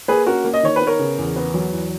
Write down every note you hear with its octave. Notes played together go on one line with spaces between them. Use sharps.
A#3 G#4 B4
C#4 F#4 A#4
A#3
D#5
D#3 C#5
B4
B3
A#4 C#5
C#3
E2
B3
F#3
E2